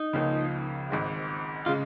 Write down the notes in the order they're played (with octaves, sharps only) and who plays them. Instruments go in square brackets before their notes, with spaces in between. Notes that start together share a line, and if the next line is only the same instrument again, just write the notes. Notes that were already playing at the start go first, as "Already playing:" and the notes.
Already playing: [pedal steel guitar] D#4
[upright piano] C#2 C#3 F3 A#3 C#4
G#1 G#2 G#3
[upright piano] C#3 G#3 [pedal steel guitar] F4